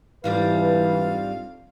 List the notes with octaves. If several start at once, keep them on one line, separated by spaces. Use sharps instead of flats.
F2 G#2 E3 G3 D4 B4 F5